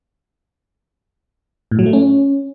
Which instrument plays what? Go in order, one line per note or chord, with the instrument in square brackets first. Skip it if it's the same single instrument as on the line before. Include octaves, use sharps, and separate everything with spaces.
[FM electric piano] A2
F#3
A3
C#4